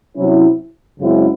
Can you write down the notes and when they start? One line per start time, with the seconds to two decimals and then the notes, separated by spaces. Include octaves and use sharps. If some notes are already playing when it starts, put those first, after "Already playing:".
0.16 C3 F#3 C#4 E4
0.98 F#2 C#3 G#3 C4 E4